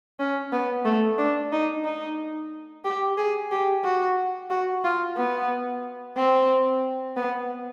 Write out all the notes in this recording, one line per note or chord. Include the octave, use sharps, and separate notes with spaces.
C#4
B3
A3
D4
D#4
D#4
G4
G#4
G4
F#4
F#4
F4
B3
C4
B3